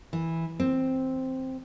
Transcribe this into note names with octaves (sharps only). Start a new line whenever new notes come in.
E3
C4